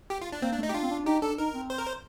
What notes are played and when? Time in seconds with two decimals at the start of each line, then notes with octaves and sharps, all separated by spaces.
0.10 G4
0.21 F4
0.32 D4
0.42 A#3 C4
0.53 D4
0.58 A3
0.63 D#4
0.69 G4
0.74 D4 F4
0.83 C4
0.90 D4
1.06 D#4 G4
1.22 D4 A4
1.38 D#4 A#4
1.54 C4
1.70 C5
1.78 A#4
1.87 C5